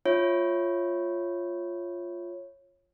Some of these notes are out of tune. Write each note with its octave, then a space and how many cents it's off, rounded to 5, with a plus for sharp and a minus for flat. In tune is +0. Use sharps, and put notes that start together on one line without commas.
F4 +0 C#5 -15 E5 -5